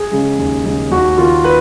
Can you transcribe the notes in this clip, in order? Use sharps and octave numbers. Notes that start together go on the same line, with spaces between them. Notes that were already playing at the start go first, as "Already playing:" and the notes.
Already playing: G#4
C#3 G#3
D#2
C#3 G#3
D#2 F#4
D#3 A#3 F4
B4